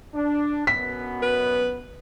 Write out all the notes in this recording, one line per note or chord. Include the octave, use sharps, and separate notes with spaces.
D4
F#2 B2 B3 B6
B4